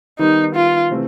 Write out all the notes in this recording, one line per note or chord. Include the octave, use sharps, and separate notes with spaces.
D#3 G3 B3 D#4
F4
C3 E3 A3 C4